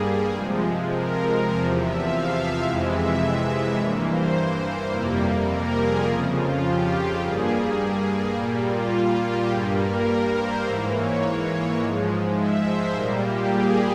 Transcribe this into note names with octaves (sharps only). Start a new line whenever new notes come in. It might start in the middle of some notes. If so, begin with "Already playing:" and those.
Already playing: G2 G3 A#3 G#4
C3 F3 G#3
A#4
A#4
E2 C3 F3 A#4
E5
F5
E5
F2 C3 E3 G#3 F5
E5
G2 E3 A#3 C#5
C5
F2 C3 G3 A#3
A#4
G#4
F2 C#3 F3 F4
F4
G4
G4
G2 G3 A#3 G#4
A#2 G3 A#3 G4
F4
F4
G4
G2 G3 A#3 G#4
A#4
A#4
C5
G#2 E3 A#3 E5
C#5
G#2 F3 G#3
E5
C5
A#2 G3 A#3 A#4
G4
G#4